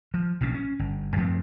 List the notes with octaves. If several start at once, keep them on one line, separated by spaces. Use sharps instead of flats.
F3
B1 A#2 C#3 C#4
C#4
G1
F#2 F3 A3 C4